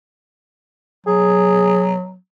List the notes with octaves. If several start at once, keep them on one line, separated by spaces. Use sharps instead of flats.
F#3 G#4